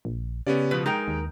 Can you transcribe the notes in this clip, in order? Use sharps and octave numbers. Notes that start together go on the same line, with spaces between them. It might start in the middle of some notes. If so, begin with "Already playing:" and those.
A#1
C#3 B3 C#4 G4 D5
B2 F3 B4
G#3 D#4 A#4 G5 G6 D7
D#2